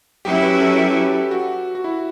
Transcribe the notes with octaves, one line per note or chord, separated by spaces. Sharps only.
F#3 C#4 E4 G4
B4
A4
G4
F#4
F#4
E4